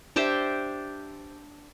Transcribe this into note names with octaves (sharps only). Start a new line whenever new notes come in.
D4 G4 C5 E5